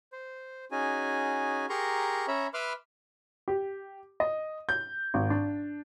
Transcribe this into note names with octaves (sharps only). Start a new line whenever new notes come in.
C5
C#4 D#4 F#4 G#4 G#5
G4 G#4 A#4 A#5 C6 C#6
C#4 C#5 E5 A#5 B5
B4 E5 B5 C6 D6 F6
G4
D#5
G6
G#1
D4